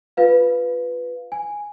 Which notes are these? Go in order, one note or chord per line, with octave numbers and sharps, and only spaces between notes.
F4 B4 F5
G#5